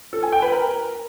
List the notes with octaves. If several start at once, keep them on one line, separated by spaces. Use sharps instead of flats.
A4
G#5
G5
B4
A#4